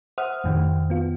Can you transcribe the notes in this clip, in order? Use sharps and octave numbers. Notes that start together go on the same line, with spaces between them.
C5 E5 F#5 D#6 F6
F2 A2 D#3 G5
B3 F4